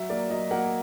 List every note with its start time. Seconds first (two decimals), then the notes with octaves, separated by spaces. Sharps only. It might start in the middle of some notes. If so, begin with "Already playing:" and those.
Already playing: F#3 E5
0.09 A#3 D5
0.30 F#3 D#5
0.51 A#3 F#5